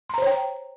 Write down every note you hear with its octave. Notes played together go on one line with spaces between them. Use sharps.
C5 C#5 G5 A#5 C6